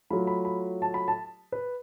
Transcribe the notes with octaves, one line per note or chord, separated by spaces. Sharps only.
F#3 A3 F4 B5
B5
B5
A5
B5
A5
B4